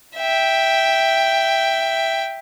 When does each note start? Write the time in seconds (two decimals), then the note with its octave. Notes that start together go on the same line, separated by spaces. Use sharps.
0.17 E5 G5